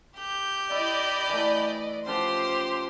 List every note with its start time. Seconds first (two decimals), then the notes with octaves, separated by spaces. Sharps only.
0.18 G4 G6
0.71 E4 D5 D#5 B5
1.28 E3 A3
2.07 C#3 F3 G4 C5 F#5 C6